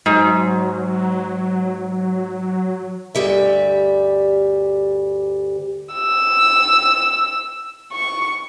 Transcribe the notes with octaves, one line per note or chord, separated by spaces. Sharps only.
G#2 F#3
D2 G2 G3 E5
E6
C#6